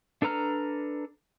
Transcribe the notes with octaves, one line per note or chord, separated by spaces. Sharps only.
D4 A4 B4 A#5 F6